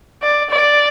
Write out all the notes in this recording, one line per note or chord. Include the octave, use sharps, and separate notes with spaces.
D5
D5